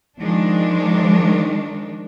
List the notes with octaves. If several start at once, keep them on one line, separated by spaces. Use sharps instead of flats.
D#3 F3 G#3 D4